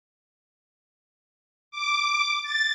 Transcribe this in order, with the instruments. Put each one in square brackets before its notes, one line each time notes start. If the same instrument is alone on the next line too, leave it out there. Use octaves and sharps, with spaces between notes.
[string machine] D6
A6